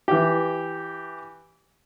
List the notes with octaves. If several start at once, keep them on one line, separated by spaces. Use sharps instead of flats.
E3 G4